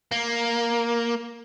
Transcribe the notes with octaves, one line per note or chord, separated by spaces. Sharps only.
A#3